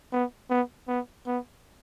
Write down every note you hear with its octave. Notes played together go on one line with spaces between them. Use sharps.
B3
B3
B3
B3